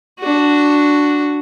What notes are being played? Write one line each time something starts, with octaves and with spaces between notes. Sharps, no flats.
D4 F#4